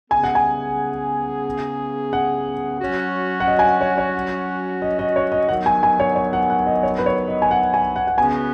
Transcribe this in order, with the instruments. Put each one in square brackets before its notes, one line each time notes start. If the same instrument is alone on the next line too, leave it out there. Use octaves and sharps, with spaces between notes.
[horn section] C#3 B3 G#4 [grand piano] G#5
[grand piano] F#5
G#5
F#5
[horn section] F#3 C#4 F#4
[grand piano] F#5
D#5
G#5
F#5
C#5
C#5
D#5
D#5
C#5
D#5
[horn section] D#3 [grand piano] F#5
[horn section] F#3 B3
[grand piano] G#5
G#5
C#5
C#5
F#5
F#5
D#5
C#5
B4
C#5
D#5
G#5
F#5
G#5
F#5
F#5
[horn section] C#3 B3 F#4 [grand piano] G#5